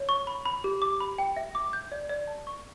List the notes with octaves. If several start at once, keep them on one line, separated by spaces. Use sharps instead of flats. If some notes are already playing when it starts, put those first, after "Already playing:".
Already playing: C#5
C#6
B5
B5
G4
D6
B5
G5
E5
D6
G6
D5
D5
A5
C#6